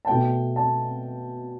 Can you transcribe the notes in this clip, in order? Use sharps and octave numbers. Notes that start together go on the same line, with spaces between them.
A5
B2 A3 G5
A5